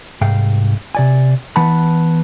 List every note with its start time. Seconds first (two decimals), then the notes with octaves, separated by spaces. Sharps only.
0.21 C2 G#2 F5 G5
0.95 C3 D5 G#5
1.56 E3 B3 F#5 A5 B5